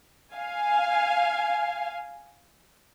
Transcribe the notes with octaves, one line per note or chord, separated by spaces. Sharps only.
F5 G#5